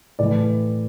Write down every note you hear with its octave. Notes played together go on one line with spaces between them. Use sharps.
A2 E3 D5